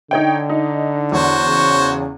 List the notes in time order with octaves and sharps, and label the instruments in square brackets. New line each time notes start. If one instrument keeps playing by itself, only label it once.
[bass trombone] D3 [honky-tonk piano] D#4 C#5 G5
[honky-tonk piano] D#4
[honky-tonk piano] E2 [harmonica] F#4 C5 C#5
[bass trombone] C#3